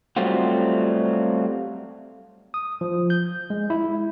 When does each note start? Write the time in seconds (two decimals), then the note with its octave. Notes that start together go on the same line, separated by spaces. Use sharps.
0.16 F#3 G3 A3 C4 F4 F#4
2.54 D#6
2.81 F3
3.10 G6
3.50 G#3
3.70 E4